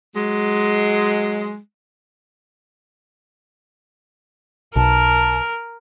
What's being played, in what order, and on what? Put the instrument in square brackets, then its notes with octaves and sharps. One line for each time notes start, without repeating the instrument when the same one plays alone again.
[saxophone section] F#3 G#3
[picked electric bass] B1 [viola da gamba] A#4 [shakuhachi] A5